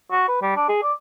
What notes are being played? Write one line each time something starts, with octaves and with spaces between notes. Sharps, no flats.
F#4
B4
G3
D4
G#4
D5